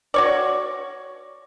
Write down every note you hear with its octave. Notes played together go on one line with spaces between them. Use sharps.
F#4 C#5 D5